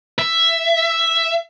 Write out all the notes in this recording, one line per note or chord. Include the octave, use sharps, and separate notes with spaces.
E5